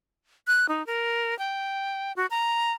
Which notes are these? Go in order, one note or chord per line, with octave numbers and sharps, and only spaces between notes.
F#6
D#4
A#4
G5
F#4
A#5